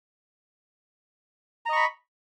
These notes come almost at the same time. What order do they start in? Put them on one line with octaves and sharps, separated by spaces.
A#5 D#5 C#6 B5